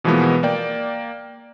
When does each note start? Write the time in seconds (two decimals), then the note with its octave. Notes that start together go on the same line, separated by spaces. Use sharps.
0.04 B2 E3 F3 G#3 A#3 B3
0.43 A#3 D5 G5